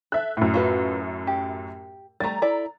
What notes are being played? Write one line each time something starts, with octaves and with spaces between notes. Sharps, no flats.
A4 E5 F#6
F#2 A2
F4 F#4 B4
G4
G3 A3 A#5 A6
E4 A4 D5